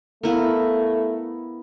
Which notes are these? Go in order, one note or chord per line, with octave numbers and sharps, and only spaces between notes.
A3 B3 E4 A#4 F5